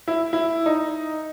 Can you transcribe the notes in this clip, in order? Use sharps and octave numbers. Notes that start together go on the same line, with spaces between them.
E4
E4
D#4